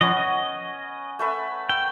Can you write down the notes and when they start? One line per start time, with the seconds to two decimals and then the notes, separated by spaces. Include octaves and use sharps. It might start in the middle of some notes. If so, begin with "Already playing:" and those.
0.01 F3 B3 C#4 D#5
0.17 D#5
1.19 A3 B4 E5
1.69 G5 E6